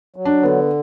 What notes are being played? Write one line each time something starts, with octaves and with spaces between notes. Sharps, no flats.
F#3
D4
D3 B3